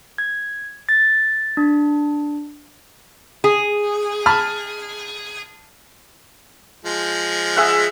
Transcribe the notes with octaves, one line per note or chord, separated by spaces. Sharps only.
G#6
A6
D4
G#4
A5 B5 F6
F3 G#3
G#4 E5 F#5